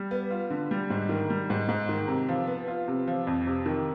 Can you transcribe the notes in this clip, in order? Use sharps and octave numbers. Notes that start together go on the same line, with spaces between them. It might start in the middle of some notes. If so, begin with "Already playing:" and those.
Already playing: G3
B3
F4
D3
G3
G#2
D#3
G3
G#2
G#2
D#3
C3
F3
B3
F4
C3
F3
F2
C3
D#3